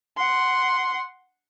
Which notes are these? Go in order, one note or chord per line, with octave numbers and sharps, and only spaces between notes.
F#5 C6